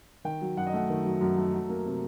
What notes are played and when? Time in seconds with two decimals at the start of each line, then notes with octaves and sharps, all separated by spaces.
0.25 D#3 G5
0.41 F#3
0.57 F#2 F#5
0.66 D#5
0.73 A3 F#5
0.90 D#3
1.05 F#3
1.21 F#2
1.37 A3
1.54 F#3
1.69 A#3
1.85 C3